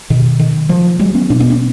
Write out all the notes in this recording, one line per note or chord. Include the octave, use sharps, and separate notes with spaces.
B2 D#3
D#3
D#3 F3
F#3 G#3
B3 C#4
B2 C4 D4
B3 C#4
C4 D4